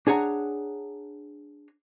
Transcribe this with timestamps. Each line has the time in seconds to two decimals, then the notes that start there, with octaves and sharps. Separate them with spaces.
0.07 D4 G#4 C#5 F#5 A#5